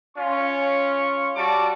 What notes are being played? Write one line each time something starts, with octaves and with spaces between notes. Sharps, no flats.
C#4 F4 C#6
G3 F#4 A5 D6